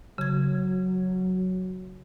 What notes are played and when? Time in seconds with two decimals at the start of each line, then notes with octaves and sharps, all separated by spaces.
0.18 C#3 F#3 G#6